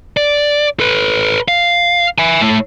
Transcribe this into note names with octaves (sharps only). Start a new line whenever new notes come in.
D5
A4 B4
F5
E5 G#5
A2 A3